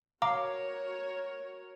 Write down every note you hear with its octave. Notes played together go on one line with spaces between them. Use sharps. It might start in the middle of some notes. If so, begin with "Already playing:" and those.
F#4 A#4 C#5 F5 A#5 D6